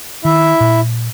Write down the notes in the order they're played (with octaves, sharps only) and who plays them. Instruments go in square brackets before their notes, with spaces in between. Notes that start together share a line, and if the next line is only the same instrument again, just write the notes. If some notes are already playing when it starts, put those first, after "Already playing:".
[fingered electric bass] D#3 [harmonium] E4 E5
[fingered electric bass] A#2